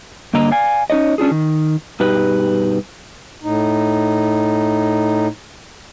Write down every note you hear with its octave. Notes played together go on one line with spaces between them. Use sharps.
G2 D3 A#3 D#5 A#5
D5 F5 G#5
C#4 D#4 C#5 D#5
C#4 D4 F4 G#4
D#3
G2 B2 D#4 G4 B4
A2 D#4